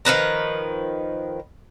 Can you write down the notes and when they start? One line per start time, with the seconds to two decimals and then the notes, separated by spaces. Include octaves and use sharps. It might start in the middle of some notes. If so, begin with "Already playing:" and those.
0.05 D#3 F3 B4 A#5